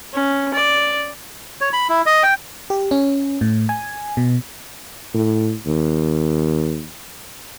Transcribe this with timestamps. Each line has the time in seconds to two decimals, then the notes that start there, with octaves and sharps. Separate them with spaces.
0.14 C#4
0.54 D5
1.61 C#5
1.73 B5
1.89 E4
2.06 D#5
2.23 G5
2.70 G4
2.91 C#4
3.41 A2
3.69 G#5
4.17 B2
5.14 A2
5.66 D#2